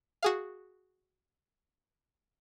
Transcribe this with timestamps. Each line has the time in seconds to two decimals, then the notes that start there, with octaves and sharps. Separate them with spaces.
0.23 F#4 G#4 F5